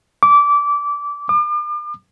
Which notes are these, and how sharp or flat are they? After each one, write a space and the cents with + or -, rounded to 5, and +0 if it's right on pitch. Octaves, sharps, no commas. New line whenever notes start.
D6 -20
D6 +40